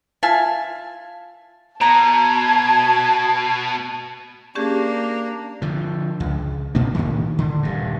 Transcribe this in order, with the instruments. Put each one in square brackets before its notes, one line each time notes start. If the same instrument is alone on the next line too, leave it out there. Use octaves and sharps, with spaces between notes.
[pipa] F4 E5 G#5 A5
[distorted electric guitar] B2 [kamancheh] A5 [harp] A#5 [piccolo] G#6
[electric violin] A#3 [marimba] C#4 G4 G#4 [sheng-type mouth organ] D4
[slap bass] D3 F3
C#2
A#2 A#3 D4
A2 D#3
D3
D#1 G2